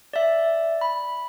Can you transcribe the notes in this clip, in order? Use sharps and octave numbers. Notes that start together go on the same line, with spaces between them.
D5 E5
B5